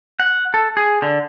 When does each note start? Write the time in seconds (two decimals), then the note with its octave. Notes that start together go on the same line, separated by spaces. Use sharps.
0.20 F#5
0.54 A4
0.77 G#4
1.02 D3